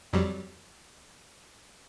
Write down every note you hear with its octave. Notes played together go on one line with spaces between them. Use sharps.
F2 F#3 G3